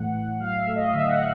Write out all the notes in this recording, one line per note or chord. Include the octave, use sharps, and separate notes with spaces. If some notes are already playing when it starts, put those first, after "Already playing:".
Already playing: A2 E3 A3 F#5
A2
F#3 F5
E5
A3
D#5
D3 E5
F#5